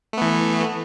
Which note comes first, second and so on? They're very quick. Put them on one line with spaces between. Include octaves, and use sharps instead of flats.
A3 B3 E3